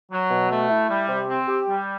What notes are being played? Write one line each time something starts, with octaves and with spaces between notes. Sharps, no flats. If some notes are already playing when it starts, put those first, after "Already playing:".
F#3
B2
A3
E4
G3
C3
C4
G4
G3